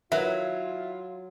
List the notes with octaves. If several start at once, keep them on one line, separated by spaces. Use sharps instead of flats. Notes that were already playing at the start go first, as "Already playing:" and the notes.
F#3 E4 F4 A#4 B4 E5